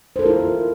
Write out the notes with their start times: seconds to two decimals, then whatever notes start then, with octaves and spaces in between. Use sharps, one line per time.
0.16 C5
0.19 A4
0.22 A#4
0.26 F4
0.29 E4